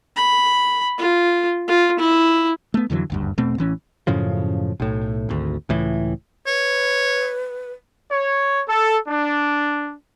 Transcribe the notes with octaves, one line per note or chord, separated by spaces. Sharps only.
B5
F4
F4
E4
A3 B3
F2 D3 E3 F#3
F#1 D2 G2
E1 B2 A3 C4
A1 E3 C#4
F#2 A2 C#3 F3
B1 A2
G#1 D2
C#2 A2 E3
B4 C#5
C#5
A4
D4